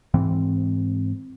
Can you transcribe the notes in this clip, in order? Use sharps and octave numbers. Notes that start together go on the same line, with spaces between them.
G#2 E3 C4